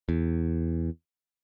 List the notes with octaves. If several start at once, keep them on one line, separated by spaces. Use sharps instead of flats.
E2